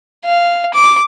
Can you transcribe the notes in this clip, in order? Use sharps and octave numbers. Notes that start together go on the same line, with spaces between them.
F5
D6